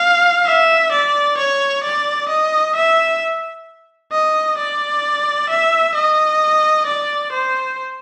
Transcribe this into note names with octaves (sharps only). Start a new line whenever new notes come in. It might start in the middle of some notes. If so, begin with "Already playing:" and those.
Already playing: F5
E5
D5
C#5
D5
D#5
E5
D#5
D5
E5
D#5
D5
C5